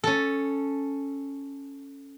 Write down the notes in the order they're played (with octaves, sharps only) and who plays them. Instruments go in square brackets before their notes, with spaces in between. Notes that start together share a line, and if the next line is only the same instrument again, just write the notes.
[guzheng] C#4 A4